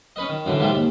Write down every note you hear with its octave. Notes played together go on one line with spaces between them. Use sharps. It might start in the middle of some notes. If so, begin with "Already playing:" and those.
C#4 B4 D#5
D#3
F#2 A2 D3 E3
G#2 C3 E3 F3 G3 G#3
D#2